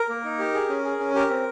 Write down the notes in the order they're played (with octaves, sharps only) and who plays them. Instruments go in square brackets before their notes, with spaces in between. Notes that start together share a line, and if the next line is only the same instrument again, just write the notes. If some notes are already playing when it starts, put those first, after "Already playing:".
Already playing: [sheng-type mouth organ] A#4
A#3
D#4
G4
G#4
C#4
G#4
C#4
G4 A#4
C4